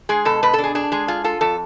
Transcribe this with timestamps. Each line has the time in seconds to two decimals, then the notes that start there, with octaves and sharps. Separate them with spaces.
0.09 G#3 G#4
0.25 B2 A4
0.43 B2 B4
0.53 A4
0.58 D4
0.64 G#4
0.75 D4 G#4
0.92 G#3 G#4
1.08 F4 G#4
1.24 F4 A4
1.41 F2 A4